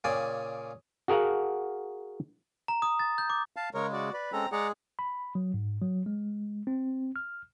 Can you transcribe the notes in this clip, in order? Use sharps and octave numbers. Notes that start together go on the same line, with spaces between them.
A#2 C#3 D5 G5 G#5
F#4 G#4 A#4 F5 F#5
A#5
D#6
A6
G6
D6
F5 A5
C#3 G#3 A#4 C#5
F#4 D5
B4 D5
G#3 C4 C#4 A4 A#5
G#3 G#4 D5 F#5 A#5
B5
F#3
G#2
F#3
G#3
C4
F6